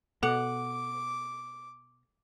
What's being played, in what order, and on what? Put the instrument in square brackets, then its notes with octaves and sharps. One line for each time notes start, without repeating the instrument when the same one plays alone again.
[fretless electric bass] B2 [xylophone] A4 [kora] F#5 [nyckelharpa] D6